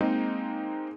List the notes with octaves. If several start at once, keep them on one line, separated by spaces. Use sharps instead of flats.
G#3 A#3 C4 D#4